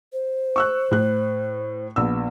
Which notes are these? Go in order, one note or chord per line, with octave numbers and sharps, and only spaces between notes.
C5
C#6 E6 F#6
A2 F#6
A#1 B3 E6